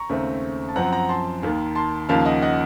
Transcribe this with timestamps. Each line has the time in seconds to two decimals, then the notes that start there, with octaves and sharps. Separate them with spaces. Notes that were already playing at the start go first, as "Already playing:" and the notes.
Already playing: A#5 C#6
0.09 D#2 C#3 A3 C4
0.69 A5
0.76 F#2 F3 C4 F#5 A#5
0.92 F#5 A#5
1.09 A5 C6
1.43 D#2 D#3 A#3
1.75 A5 C6
2.09 D#2 C#3 F3 A#3 F5 A5
2.26 D#5 F#5
2.42 D#5 F#5